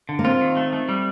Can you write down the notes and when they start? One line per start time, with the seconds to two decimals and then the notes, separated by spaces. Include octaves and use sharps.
0.09 D3
0.19 A#3
0.24 C4 F4
0.41 D#3
0.57 A3
0.73 A3
0.89 G3